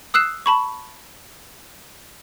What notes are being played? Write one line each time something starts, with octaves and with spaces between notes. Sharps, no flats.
D#6 E6 F#6 C7 E7
A5 B5 C#6